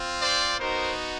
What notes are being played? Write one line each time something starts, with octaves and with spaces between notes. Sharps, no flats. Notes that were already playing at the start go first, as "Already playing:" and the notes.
Already playing: C4 F4
C5 D5
B3 D#4 F#4 A#4 C5